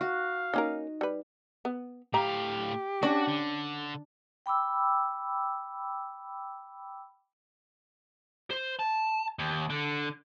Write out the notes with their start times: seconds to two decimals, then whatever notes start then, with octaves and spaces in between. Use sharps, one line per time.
0.01 F#4 F5
0.54 A#3 C#4 D#4 A#4
1.01 G3 B4
1.65 B3
2.14 A2 G4 F5 A#5
3.03 C#4 D4 F#4
3.28 D3
4.46 G5 B5 D6 E6
8.51 C5
8.79 A5
9.39 D#2
9.70 D3